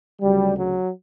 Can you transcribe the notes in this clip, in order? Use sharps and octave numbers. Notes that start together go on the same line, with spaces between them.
D2 C#3 F#3 G3
F#3